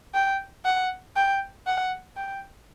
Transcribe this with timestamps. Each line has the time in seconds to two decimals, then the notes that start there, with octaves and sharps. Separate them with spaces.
0.14 G5
0.65 F#5
1.16 G5
1.67 F#5
2.16 G5